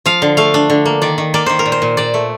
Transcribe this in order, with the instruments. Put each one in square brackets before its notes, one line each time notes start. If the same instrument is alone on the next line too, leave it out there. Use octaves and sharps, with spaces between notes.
[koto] F3 F5
D3
A3 F5
D4
D3
A#3
D#3 D5
D#3
A#3 D5
D#3 C5
A#4
A#2
C5
A#2
A#2 D5
A3